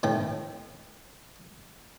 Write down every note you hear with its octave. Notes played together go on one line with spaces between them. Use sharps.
A2 D#3 A3 G5